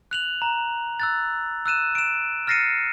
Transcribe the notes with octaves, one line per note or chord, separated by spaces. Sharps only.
F#6 F7 F#7
A#5
E6 F#6 A6
E6 F#6 D#7 E7
D7 E7
F6 A6 A#6 C7 C#7 D#7